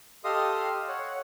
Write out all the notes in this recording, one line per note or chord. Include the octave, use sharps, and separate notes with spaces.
G4 A4 D#5 F5 C6 D#6
C#5 F#5